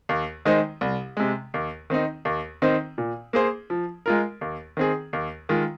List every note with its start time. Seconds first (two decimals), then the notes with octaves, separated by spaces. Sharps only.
0.09 D#2
0.45 D#3 G#3 D#4 C5
0.81 C2
1.17 C3 G#3
1.54 D#2
1.90 D#3 C4 D#4
2.25 D#2
2.62 D#3 C4 D#4 C5
2.98 A#2
3.33 A#3 G#4 C5
3.70 F3
4.06 G#3 F4 A#4
4.41 D#2
4.77 D#3 C4 G#4
5.13 D#2
5.49 D#3 G#3 F4